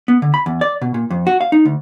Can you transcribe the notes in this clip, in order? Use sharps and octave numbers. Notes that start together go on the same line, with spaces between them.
B3
D3
B5
E2
D5
B2
A#2
F2
F#4
F5
D#4
D2